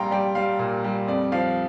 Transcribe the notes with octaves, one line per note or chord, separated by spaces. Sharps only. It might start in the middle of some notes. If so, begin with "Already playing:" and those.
Already playing: A#1 G3 F5 G5 A#5 C6
G3 D5 G5
G3 F5
A#2
G3
F2 D5
F3 F5